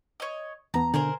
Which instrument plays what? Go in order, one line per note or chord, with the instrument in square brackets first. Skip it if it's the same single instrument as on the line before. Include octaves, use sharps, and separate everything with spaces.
[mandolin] C#5 D#5
[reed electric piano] E2 B3 [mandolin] A#5
[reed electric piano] B2 D3 [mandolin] G#4 A#4 C5